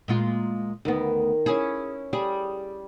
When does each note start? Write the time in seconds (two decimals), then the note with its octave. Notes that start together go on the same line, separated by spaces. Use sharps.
0.08 A#2 G#3 F4
0.85 D2 D#3 B3
1.46 C#4 E4 G#4
2.13 G3 G#4